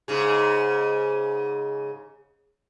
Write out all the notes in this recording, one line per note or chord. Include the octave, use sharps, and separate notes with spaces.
G#2 C#3 G#4